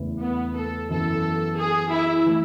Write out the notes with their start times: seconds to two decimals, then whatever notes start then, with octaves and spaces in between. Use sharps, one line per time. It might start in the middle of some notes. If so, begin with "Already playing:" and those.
Already playing: E2 C#3 E3 A3
0.21 B3
0.56 A4
0.89 F#2 E3 B3 A4
1.57 G#4
1.91 E4
2.26 E3 A3